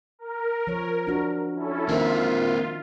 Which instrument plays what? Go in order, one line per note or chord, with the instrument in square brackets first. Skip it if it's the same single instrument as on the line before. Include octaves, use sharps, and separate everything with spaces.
[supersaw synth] A#4
[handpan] F3 C#5
D4 F#4
[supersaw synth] C#4 E4 A4
[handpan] D#3 A#4 E5 [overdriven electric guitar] A#3 C4 [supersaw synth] F4